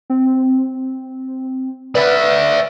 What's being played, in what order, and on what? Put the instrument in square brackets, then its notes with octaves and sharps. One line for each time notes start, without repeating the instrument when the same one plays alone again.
[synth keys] C4
[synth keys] B4 [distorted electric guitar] D5 E5